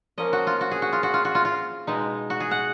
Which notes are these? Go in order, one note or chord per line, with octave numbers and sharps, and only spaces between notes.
F3 A#3 C#4 D#5
F#4
F4
F#4
G#4
F#4
F4
F#4
F4
F#4
F4
F4
B2 G#3 D#4
F#4
G#4
F#5